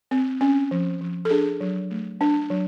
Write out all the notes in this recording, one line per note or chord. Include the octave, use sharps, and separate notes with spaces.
C4
C#4
F3
F3
A4
D4 G#4
F#3
A3
D4
F#3